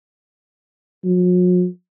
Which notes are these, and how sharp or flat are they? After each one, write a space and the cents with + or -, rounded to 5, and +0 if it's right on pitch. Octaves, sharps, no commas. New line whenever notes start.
F#3 -45